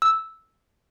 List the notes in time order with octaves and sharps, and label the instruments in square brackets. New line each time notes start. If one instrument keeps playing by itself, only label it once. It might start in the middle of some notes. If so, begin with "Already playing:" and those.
[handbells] E6